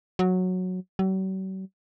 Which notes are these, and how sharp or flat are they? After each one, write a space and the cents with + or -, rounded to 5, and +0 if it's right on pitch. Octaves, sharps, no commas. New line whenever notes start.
F#3 -10
F#3 +45